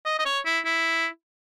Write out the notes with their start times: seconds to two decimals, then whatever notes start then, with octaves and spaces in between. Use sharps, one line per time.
0.06 D#5
0.19 D#5
0.26 C#5
0.46 E4
0.65 E4